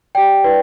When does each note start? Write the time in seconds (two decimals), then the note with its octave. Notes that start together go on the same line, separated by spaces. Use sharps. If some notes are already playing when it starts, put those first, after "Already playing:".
0.15 G4 D5 G5
0.44 E4 B4 D5